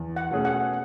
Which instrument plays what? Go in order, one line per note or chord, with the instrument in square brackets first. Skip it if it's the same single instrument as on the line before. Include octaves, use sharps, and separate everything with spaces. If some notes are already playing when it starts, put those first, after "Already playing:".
Already playing: [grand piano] E2
[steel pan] F#5
[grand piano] B2 A3 C#4 G#4
[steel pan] F#5